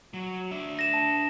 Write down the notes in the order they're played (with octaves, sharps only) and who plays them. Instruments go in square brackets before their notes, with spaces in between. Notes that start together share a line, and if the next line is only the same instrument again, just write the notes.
[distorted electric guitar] F#3
D4 E5
[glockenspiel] A#6 E7
A5